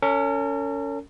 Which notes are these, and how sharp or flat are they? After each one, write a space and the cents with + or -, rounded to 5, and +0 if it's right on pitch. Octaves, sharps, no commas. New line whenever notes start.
C#4 +20 A#4 -45